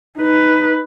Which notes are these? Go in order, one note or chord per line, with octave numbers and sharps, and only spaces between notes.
D#4 B4